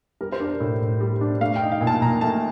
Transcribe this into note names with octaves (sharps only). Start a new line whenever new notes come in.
G3 A#4
C5
D4 A#4
A2
A2
G3
D4
A3 F5
G5
D#4
F5
A#2
A5
A#2 A#5
A3 A5